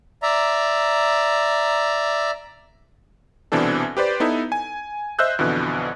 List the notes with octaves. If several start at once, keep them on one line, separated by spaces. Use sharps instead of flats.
D5 E5 A#5
C2 B2 E3 C4 D4 A4
G4 B4 C5 D5
B3 D#4 E4 A4 B4
G#5
C5 D#5 E5 E6 F#6 G6
F2 B2 D3 E3